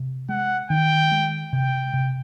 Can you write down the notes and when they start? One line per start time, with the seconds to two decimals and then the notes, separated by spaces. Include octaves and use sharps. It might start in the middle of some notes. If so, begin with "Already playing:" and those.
Already playing: C3
0.29 G#3 F#5
0.70 D#3 G5
1.12 G#3
1.52 C3 G5
1.94 C3